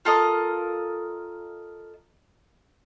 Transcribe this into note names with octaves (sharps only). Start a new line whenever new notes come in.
F4 A4 A#4 D#5